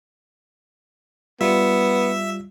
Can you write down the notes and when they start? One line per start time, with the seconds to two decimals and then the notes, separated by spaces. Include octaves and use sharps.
1.41 G3 B3 F4 E5